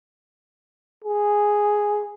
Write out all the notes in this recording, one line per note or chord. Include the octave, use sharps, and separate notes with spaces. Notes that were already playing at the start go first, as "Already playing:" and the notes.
G#4